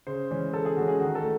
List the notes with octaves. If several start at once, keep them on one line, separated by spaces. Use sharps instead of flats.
C#3 C5
E3 G#3 C#4
C#3 A4
G#4
E3 G#3 C#4 F#4
G#4
D#3 F#4
A4
A3